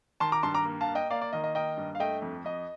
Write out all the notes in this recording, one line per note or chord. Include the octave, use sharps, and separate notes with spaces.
D#3 A5 C6
A#5 D6
G2 A5 C6
A#5 D6
A#3
F5 A5
A#3
D#5 G5
A#3 D5 F5
D5
D#3 D#5
D#5
A#3 D#5 G5
G2
F5
A3 D#5 G5
F2
F2 D#5